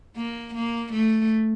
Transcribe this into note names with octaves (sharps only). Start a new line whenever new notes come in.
A#3
A#3
A3